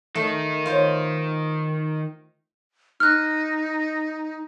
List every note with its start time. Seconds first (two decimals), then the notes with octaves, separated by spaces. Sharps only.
0.15 D#3 A3 D#4
0.66 F4 C5 C#5
3.00 D#4 F6 F#6